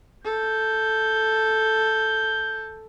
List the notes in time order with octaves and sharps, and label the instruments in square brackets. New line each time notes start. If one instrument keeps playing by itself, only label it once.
[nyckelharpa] A4 [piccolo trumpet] G6